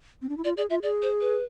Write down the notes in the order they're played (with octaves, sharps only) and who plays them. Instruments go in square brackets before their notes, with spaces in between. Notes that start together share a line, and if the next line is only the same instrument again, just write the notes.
[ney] C4
D4
E4
[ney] F4 [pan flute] D5
[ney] G#4 [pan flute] D5
[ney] F4 [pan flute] E5
[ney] G#4 [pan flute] D5
[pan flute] C5
B4